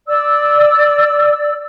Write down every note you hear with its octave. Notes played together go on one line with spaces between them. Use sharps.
D5 E6